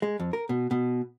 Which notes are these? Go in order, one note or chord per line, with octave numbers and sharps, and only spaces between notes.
G#3
F2
A#4
B2
B2